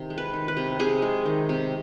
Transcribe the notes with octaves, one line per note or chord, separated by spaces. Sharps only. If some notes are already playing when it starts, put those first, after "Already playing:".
Already playing: C3 D#3
G#3
B4
D#3
B4
C3
C3 G#4
G#3
D#3
C3